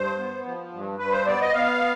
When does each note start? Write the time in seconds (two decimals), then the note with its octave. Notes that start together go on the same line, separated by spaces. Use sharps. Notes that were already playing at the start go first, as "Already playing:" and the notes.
Already playing: G2 C5
0.18 B3
0.46 F3
0.73 G2
0.99 G2 B4
1.12 C5
1.26 B3 D5
1.41 D#5
1.54 B3 F5